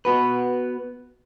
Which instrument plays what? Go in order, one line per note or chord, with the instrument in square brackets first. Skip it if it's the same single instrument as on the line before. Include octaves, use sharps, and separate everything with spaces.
[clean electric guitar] B3 F#4 B4